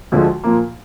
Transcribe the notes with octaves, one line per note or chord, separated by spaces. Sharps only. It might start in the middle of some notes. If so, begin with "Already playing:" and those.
D2 D3 F3 G#3
A#2 F3 A#3